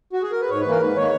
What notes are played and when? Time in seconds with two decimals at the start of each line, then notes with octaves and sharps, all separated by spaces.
0.13 F#4
0.22 G#4
0.31 A#4
0.41 B4
0.50 G#2 C#5
0.60 B4
0.66 E3 A#3 A#4
0.80 G#2 B4
0.96 D#3 A#3 C#5